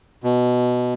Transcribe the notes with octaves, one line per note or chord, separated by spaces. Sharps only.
B2